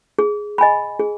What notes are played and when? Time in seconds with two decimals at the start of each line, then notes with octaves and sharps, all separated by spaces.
0.19 G#4
0.58 D#5 G#5 B5
0.99 G#4